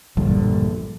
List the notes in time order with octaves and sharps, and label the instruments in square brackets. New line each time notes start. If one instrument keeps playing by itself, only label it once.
[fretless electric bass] E1 A#1 G2 D3